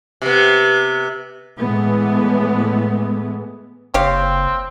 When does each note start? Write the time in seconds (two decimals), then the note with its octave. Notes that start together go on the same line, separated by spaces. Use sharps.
0.22 C3 B3
1.58 A2 E3 G#3 A3 B3
3.94 F#1 C4 G4 C#5 F5